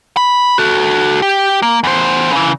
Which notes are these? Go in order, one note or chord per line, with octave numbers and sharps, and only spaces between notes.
B5
F#4 A4
G4
A#3
E2 C5
C#3 E3